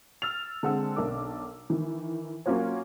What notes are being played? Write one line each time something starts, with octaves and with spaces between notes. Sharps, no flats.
E6 F6 A6 F7
D3 G#3 C4 F#5 A5 E6
B1 D4 A#4 D6
D#3 E3
F#3 A#3 C#4 F4 F#4 C#5